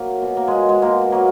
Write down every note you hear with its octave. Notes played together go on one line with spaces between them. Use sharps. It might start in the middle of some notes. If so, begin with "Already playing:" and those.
Already playing: F#3 A#3
B2
A#3
B2 G#3
G#3
B2 A#3
F#3 A#3